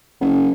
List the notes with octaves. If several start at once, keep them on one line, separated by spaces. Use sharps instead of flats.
F#1